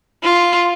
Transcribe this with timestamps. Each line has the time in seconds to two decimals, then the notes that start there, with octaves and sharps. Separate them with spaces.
0.23 F4